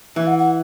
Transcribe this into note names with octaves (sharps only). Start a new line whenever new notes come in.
E3 E5
F#5
F#5